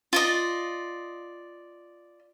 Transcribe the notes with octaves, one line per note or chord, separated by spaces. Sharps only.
F4 D5 D#5